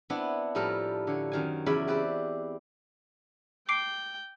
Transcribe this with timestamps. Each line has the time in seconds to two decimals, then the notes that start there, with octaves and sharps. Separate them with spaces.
0.10 B3 C4 D4 E4
0.55 A2 F3 G3 A4 A#4 B5
1.07 D3 C#5
1.32 F#2 D#3 G#5
1.66 E2 C#3 E4 D5 G#5 B5
1.88 C4 G4 B4 C5 D5
3.69 G5 D6 C7 D7